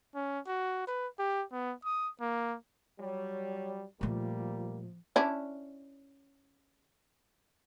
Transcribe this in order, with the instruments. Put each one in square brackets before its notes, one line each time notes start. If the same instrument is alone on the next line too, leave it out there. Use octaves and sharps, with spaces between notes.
[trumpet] C#4
F#4
B4
G4
B3
D#6
A#3
[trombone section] F#3 G3 [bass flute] C#5
[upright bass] A#2 A3 [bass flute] F3 [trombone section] G3 A#3
[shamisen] C#4 D4 E4